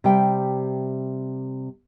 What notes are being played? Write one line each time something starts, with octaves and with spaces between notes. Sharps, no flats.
C3 G3 G5